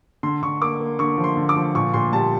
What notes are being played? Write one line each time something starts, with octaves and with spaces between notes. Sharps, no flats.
D3 C6
D3 C#6
A#3 D6
A#3
D3 C#6
F3
C6
D3
D6
F3
A#2 C#6
A#2 C6
G3 A5